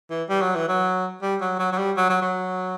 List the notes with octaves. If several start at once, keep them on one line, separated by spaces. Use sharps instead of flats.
E3
G3
F#3
E3
F#3
G3
F#3
F#3
F#3
G3
F#3
F#3
F#3